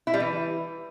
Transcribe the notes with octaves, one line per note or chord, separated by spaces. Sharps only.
E4
G3
E3